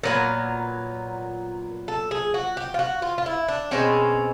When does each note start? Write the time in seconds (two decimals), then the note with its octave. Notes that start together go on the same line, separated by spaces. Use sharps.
0.03 A#2 F#3 B3 A#4
1.88 A4
2.11 G#4
2.34 F#4
2.57 G4
2.74 F4
2.79 F#4
3.02 F4
3.18 F4
3.26 E4
3.48 D4
3.71 B2 G#3 C4 C#4